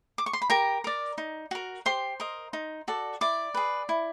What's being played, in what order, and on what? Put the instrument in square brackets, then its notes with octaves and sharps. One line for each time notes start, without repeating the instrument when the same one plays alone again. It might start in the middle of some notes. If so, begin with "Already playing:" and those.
[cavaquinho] D6
C#6
C6
B5
G4 A#4 A#5
A#4 D5
D#4
F#4 A#4
G4 C5 C6
A#4 D#5
D#4
F#4 A4 D5
E4 D5 D6
G#4 B4
E4